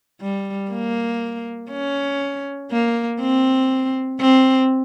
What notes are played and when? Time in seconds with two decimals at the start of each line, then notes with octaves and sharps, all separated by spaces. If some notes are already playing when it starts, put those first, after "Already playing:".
0.21 G3
0.71 A#3
1.70 C#4
2.71 A#3
3.20 C4
4.20 C4